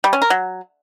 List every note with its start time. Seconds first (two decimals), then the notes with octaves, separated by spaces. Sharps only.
0.04 G3
0.13 C#4
0.22 A#4
0.30 F#3